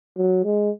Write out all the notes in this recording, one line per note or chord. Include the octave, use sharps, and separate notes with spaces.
F#3
G#3